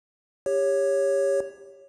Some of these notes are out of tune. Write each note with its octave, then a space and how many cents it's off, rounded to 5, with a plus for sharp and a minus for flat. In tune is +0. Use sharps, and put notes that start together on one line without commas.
G4 +25 C#5 +0